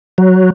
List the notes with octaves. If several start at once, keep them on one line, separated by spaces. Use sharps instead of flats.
F#3